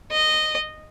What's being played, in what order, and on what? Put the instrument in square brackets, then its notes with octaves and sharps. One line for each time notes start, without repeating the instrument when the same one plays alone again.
[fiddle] D#5